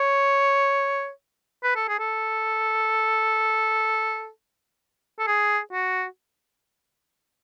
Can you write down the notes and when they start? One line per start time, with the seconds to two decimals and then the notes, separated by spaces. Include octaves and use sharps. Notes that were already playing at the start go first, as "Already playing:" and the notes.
Already playing: C#5
1.63 B4
1.76 A4
1.88 G#4
1.99 A4
5.19 A4
5.27 G#4
5.73 F#4